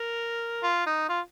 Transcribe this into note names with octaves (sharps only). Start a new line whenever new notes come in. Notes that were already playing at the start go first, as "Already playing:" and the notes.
Already playing: A#4
F4
D#4
F4